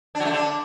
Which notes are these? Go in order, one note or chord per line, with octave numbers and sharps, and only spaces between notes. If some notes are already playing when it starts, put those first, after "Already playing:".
D4
F#3
A3
D3
D4